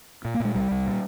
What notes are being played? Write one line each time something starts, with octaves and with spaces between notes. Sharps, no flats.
A#2
A#3
A#2 G#3
C2 G3
C2
A#2